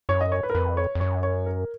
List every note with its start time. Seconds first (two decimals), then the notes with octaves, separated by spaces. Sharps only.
0.09 F#2 C#5
0.21 D#5
0.32 C#5
0.43 B4
0.50 A#4
0.55 F2 B4
0.77 C#5
0.95 F2
1.00 F#2 C#5
1.23 C#5
1.46 A#4